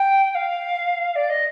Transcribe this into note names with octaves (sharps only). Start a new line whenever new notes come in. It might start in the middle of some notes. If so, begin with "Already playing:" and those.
Already playing: G5
G5
F5
D5
D#5